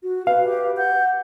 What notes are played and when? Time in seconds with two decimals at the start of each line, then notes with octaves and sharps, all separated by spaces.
0.03 F#4
0.27 B4 F5
0.43 G4
0.77 F#5 G6